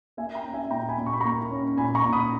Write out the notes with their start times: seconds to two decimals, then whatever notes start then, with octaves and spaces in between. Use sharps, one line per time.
0.17 A#3 E5 G#5
0.35 G5 A#5
0.44 C#4
0.54 E5 G#5
0.71 A#2 G5 A#5
0.89 G#5 B5
0.97 A#2
1.06 C#6
1.13 B5
1.20 A#3 A#5 C#6
1.51 C#4
1.77 A#2 G#5 B5
1.95 A#5 C#6
2.04 A#2
2.13 B5 D#6